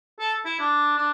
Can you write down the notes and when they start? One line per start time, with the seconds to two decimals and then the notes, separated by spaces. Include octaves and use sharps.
0.20 A4
0.45 E4
0.59 D4
0.97 D4